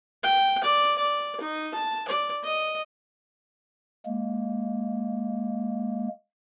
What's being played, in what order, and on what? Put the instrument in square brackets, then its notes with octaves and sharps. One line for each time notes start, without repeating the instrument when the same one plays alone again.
[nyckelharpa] G5
D5
D5
D#4
A5
D5
D#5
[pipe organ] G#3 A#3